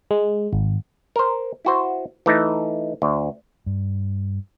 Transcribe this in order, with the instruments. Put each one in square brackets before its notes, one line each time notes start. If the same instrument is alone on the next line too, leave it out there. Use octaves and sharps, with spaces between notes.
[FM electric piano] G#3
G#1
[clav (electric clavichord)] A#4 C5
E4 F#4 C5
E3 A3 D#4
D2
[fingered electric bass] G2